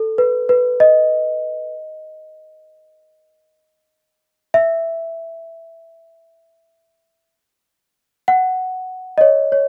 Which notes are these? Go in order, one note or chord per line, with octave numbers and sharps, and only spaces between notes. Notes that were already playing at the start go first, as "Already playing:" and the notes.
Already playing: A4
B4
B4
D#5
E5
F#5
D#5
C#5
C#5